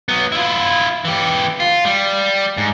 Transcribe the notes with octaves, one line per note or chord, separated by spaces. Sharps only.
F#3 B3
E4 F4
E3 G4
F4
G3
G#2